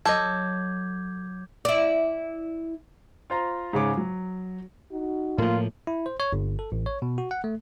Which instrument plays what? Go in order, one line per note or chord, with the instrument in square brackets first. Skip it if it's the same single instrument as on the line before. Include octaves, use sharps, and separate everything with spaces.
[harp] F#3 [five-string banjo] A4 D#5 [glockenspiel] D6 G6 G#6
[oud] E4 D5
[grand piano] F4 C5 A#5
G#2 C#3 G#3 G#4 C#5 D6
F#3
[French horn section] D#4 F#4
[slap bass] A2 F3 [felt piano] A#3 [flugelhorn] F4
[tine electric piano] E4
C5
C#5
G1
A4
A1
C#5
B2
F#4
F#5
A3